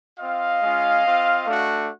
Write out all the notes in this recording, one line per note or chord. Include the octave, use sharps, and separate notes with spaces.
C4 F4 D#5 F5
G#3 C#4 F4
C4 F4
A3 D4 F#4